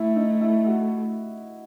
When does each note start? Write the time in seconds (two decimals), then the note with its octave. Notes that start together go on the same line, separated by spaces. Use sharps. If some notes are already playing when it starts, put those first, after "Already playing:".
Already playing: A3 E4
0.16 D#4
0.41 E4
0.66 F#4